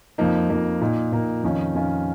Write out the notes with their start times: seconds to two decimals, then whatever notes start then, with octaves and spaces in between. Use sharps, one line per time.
0.18 F2 F3 A#3 D#4
0.49 F2 F3 A#3 D#4
0.81 A#2 A#3 D#4
1.12 A#2 A#3 D#4
1.43 F2 D#3 C#4 F4
1.74 F2 D#3 C#4 F4